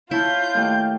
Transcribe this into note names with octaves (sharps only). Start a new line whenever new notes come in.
E4 F4 C#5 F5 A5 G6
D#2 A3 G5